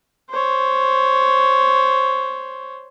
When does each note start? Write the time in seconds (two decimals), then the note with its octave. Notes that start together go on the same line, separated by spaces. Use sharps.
0.30 C5 C#5